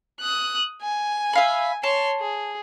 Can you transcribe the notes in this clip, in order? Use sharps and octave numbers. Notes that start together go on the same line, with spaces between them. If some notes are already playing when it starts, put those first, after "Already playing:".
D#6 F#6
G#5
E5 F5 B5
C#5 A5 C6
G#4